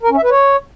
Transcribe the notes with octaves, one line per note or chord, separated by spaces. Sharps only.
A#4
C#4
E5
B4
C#5